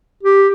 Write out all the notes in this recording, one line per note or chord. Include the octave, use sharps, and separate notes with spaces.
G4